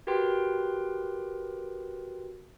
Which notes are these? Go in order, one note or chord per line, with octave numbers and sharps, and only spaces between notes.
F#4 G4 A#4 B4 G5 C6